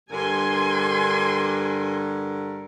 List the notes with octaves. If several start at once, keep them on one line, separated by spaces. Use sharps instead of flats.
G2 D3 A#4 G#5 C6